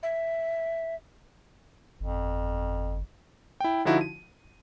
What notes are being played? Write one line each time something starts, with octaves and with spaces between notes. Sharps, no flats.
E5
G1 F2
E4 G5
D3 F3 D#4 E4 F#4
D#7